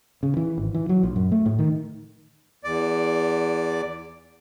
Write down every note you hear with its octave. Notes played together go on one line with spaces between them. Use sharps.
C#3
E3
G#1
E3
F#3
A#1
F#2
A3
A2
D#3
E2 D5